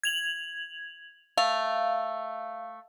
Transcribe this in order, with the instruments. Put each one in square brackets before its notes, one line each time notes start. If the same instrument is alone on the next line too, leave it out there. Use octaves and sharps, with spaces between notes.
[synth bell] G#6 F7 F#7
[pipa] A3 [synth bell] F5